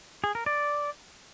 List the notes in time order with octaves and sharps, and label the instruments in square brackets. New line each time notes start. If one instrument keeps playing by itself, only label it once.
[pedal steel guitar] G#4
A#4
D5